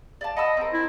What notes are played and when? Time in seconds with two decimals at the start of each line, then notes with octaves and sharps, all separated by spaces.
0.21 D5 F5 A5
0.37 D#5 F#5 B5 E6
0.57 C4 A#4
0.73 E4